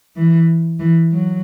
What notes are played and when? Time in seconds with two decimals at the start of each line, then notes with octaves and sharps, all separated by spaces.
0.16 E3
0.80 E3
1.12 F#3